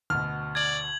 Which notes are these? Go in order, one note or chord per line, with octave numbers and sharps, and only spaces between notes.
D2 B2 F6
D5 G#6 F#7